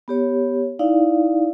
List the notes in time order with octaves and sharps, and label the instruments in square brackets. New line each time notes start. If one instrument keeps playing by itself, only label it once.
[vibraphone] B3 G4 C#5
D#4 E4 D5 F5